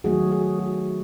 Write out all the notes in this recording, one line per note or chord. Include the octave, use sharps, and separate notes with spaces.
D#3 F#3 A3 F#4 G#4
F#4 G#4
F#4 G#4